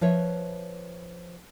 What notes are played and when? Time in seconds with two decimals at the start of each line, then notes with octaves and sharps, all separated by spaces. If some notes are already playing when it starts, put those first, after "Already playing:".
0.01 F3 B4 C#5 E5